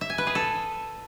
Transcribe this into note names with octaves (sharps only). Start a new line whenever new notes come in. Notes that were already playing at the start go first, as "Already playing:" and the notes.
E5
G#5
B4
G#4
A4